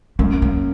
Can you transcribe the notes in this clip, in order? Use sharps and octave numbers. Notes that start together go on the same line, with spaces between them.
F#2 A3
A#3